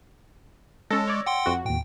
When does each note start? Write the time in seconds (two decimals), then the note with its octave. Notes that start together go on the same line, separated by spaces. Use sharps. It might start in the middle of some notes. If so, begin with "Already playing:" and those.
0.91 G#3 C#4 A4 E6 A#6
1.07 C#5 D5
1.26 F#5 G5 C6
1.46 F2 F#4
1.65 D#2 A2 G5